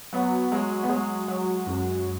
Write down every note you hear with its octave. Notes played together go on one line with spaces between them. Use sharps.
F#3 B3
F#3 G#3
B3
F#3 G#3
F#3
F#2